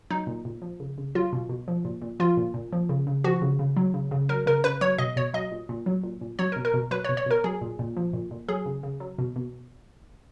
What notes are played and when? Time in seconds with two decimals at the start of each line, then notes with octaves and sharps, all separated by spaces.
0.10 F#3 D#4
0.27 A#2
0.45 A#2
0.62 F3
0.80 C#3
0.98 C#3
1.15 F#3 F4
1.33 B2
1.49 B2
1.68 F3
1.85 A#2
2.02 A#2
2.20 F3 F4
2.37 A#2
2.54 A#2
2.73 F3
2.89 C#3
3.07 C#3
3.24 F3 F#4
3.42 C#3
3.59 C#3
3.76 F#3
3.94 C#3
4.11 C#3
4.29 F#3 A#4
4.46 C#3 A#4
4.64 C#3 B4
4.81 F#3 C#5
4.98 B2 D#5
5.16 B2 C#5
5.34 F#3 D#5
5.52 A#2
5.69 A#2
5.86 F#3
6.04 A#2
6.21 A#2
6.39 F#3 C#5
6.52 A#4
6.56 B2
6.65 A#4
6.74 B2
6.91 F#3 B4
7.04 C#5
7.09 B2
7.17 C#5
7.26 B2 A#4
7.44 F#3 G#4
7.61 A#2
7.79 A#2
7.97 F3
8.14 A#2
8.31 A#2
8.49 F#3 G#4
8.66 C#3
8.83 C#3
9.00 F#3
9.18 B2
9.36 B2